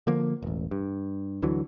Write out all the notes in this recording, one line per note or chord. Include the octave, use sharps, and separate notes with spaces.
D3 F3 A#3
E1 A1
G2
D2 D3 E3 F#3